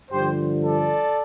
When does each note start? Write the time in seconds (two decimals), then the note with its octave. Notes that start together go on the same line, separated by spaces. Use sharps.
0.11 G2 D3 F3 G4 C5
0.64 A4 D5